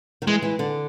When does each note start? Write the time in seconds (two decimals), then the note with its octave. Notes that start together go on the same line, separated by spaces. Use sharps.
0.22 D#3
0.27 E3 G#3
0.42 E3
0.59 D3